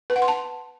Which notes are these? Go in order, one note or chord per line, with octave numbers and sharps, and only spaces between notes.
B4
F#5
C6
A5